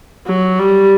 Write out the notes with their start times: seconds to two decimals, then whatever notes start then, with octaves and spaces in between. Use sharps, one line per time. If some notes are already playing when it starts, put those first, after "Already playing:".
0.26 F#3
0.59 G3